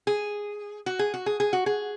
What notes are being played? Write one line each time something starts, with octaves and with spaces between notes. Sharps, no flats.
G#4
F#4
G#4
F#4
G#4
G#4
F#4
G#4